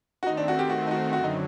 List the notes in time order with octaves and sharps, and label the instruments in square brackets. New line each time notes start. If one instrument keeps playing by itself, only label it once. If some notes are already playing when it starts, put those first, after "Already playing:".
[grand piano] F#4
[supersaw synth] D#3 A3 C4 [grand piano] D#4
[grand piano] D4
F#4
G4
F#4
D#4
F#4
[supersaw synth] F#2 D3 F#3 [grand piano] F#4
[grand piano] D#4